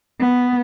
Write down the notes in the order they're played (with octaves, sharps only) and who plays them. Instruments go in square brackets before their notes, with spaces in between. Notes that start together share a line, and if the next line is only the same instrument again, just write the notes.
[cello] B3